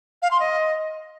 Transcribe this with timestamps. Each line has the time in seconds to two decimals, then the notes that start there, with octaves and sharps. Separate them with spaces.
0.22 F5
0.31 C6
0.40 D#5